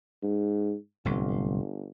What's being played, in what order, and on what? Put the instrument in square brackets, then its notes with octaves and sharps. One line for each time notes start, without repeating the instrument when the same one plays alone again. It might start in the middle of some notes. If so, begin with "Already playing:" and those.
[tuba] G#2
[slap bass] D1 C2 [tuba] G1